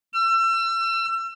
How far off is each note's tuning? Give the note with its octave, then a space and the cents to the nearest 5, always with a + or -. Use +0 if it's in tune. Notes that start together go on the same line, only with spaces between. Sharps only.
E6 +35